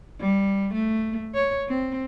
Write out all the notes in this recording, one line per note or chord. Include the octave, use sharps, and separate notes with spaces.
G3
A3
C#5
C4